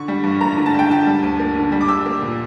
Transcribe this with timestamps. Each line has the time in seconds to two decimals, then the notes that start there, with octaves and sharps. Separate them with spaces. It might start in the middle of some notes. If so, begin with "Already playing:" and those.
Already playing: D3 C#6
0.08 G3
0.23 G2
0.41 A#3 A#5
0.58 D3
0.66 A5
0.74 G3 G5
0.90 D3 A5
1.07 G3
1.22 D2
1.40 A#3
1.56 D3
1.72 G3
1.81 D6
1.88 G3 E6
2.06 A#3
2.22 A#2